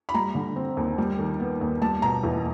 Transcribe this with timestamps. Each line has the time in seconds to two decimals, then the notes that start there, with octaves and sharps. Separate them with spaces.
0.09 B5
0.14 G3 A#5
0.35 D3
0.56 C4
0.77 D#2
0.98 G3
1.19 D#3
1.40 B3
1.61 D#2
1.82 G3 A5
2.02 B2 A#5
2.23 E2